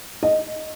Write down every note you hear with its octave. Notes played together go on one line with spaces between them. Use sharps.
D#5